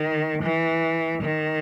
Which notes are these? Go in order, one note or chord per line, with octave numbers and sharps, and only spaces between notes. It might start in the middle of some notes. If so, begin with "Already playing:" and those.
Already playing: D#3
E3
D#3